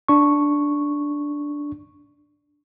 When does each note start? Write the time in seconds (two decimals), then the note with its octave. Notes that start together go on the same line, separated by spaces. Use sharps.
0.08 D4 C#6